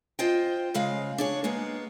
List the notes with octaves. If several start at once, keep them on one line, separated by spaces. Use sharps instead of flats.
F4 C5 D#5 G5
C#3 G#3 F5
D4 G#4 C#5
G#3 A#3 B3